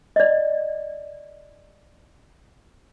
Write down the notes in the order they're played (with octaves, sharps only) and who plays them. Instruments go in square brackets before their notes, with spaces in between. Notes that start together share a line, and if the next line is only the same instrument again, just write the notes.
[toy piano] D5 D#5